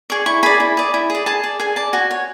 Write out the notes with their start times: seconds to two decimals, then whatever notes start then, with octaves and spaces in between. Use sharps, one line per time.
0.10 G#4 D5 C#6
0.26 E4 C#6
0.43 G#4 D5 B5
0.60 E4
0.77 G#4 D5
0.94 E4
1.10 G#4 D5
1.26 G#4 A5
1.43 D5
1.60 G#4 G#5
1.76 D5 A5
1.93 F#4 G#5
2.11 C#5